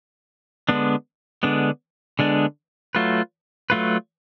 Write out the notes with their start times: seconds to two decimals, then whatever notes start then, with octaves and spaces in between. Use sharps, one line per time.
0.69 D3 G#3 B3 D4
1.43 D3 G#3 B3 D4
2.19 D3 G#3 B3 D4
2.95 F#3 A3 F4 B4
3.70 F#3 A3 F4 B4